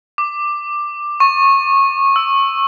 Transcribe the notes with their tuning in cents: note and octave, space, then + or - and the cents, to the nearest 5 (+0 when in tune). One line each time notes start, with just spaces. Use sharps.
D6 +10
C#6 -20
E6 +0